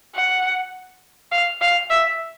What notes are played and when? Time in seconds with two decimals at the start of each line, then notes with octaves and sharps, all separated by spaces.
0.15 F#5
1.32 F5
1.61 F5
1.90 E5